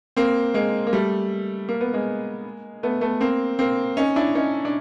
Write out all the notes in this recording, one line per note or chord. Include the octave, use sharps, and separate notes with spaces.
A#3 C4
G#3 A#3
A#3
G3 A3
A#3
B3
G#3 A#3
A3 B3
A3 B3
A#3 C4
A#3 C4
C#4 D#4
D4 E4
C#4 D#4
D4